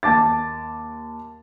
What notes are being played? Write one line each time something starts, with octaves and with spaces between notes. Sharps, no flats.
D#2 A5 D6 A6